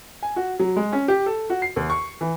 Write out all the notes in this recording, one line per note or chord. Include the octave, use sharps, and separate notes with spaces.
G#5
F#4
F#3
G#3
C#4
G4
A4
F#4
C7
D#2
C#6
E3